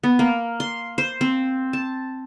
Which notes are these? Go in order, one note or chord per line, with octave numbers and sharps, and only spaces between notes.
B3
A#3
C6
C5
C4
A5